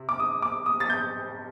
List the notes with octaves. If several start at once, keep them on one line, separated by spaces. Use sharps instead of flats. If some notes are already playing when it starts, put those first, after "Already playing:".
Already playing: C3
D6
D#6
D6
D#6
A6
G6